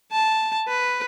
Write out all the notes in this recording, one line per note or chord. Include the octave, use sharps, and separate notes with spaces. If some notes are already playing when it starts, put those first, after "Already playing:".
A5
B4